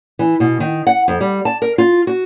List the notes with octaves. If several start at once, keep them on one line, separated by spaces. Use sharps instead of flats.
E3
B2
D#3
F#5
F2
G3
A5
A#4
F4
F#4